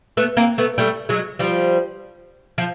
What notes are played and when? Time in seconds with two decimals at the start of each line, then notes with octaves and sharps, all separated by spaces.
0.17 A3 B3
0.37 A#3 C4
0.58 A3 B3
0.78 G3 A3
1.09 F#3 G#3
1.39 F3 G3
2.58 F3